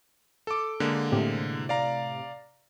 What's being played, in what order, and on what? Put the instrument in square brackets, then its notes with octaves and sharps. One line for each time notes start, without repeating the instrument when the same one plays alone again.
[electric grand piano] A4 D6
D3 G#3 A#3
[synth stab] A2 C3
[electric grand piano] D5 F5 A#5